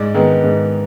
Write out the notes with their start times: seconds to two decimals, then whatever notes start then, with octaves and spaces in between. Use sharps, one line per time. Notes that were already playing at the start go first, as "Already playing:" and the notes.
Already playing: G#2 D5
0.14 D#3 G#3 B3
0.44 G#2